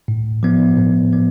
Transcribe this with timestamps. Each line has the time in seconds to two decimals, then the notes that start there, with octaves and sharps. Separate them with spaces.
0.08 A2
0.43 F3 B3
0.77 A2
1.13 F3 B3